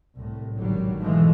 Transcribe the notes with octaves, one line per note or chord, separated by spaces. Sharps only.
C2 A2
G#1 D3 F#3 G3
G#2 B2 E3 F3 G#3 A3